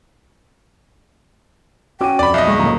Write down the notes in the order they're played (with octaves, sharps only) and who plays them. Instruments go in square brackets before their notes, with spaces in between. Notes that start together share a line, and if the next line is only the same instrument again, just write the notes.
[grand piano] C#4 D#7 [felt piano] F#4 D6 [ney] G5
[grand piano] F2 [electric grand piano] D5 B5
[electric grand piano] B1 D#5 [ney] E5
[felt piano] G#3 [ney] C#6
[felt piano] D#1 [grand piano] F#3 A#3 A#5